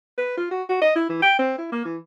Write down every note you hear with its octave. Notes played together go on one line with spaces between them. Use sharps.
B4
F4
F#4
F#4
D#5
E4
E3
G5
C4
E4
A#3
E3